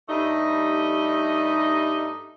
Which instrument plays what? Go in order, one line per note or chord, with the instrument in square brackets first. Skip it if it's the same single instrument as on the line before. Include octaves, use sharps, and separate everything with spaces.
[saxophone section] G2 G3 A3 D#4 D#5